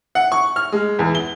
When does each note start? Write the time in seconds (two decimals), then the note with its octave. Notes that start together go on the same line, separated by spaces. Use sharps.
0.15 F#5
0.32 C#6
0.56 F6
0.72 G#3
0.99 E2
1.15 G7